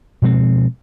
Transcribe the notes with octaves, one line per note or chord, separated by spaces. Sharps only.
B2 F3 G#3 C4